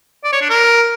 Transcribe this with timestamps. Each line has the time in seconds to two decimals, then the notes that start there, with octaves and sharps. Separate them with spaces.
0.24 D5
0.33 C#5
0.41 D4
0.50 A#4